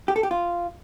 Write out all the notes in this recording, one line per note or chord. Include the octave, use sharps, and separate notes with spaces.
G4
A4
G4
F4